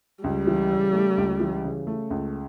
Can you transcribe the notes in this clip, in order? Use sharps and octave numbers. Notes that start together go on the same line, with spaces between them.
C#2 G3
E3
C#3
A3
C#2
E3
C#3
A3
C#2